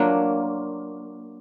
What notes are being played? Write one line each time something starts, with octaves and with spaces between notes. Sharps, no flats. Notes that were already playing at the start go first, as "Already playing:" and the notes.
Already playing: F#3 A#3 D4 F4